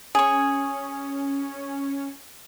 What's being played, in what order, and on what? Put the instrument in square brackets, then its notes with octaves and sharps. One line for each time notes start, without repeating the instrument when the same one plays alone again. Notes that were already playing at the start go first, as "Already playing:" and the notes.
[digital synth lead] C#4 [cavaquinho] G#4 C#5